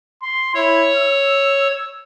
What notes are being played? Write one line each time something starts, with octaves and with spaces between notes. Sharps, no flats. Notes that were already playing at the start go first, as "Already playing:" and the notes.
C6
E4 C#5
E6